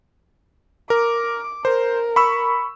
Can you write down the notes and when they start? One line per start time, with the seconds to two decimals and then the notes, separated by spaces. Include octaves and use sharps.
0.90 A#4 D6
1.65 A#4 C5
2.16 B5 C#6 E6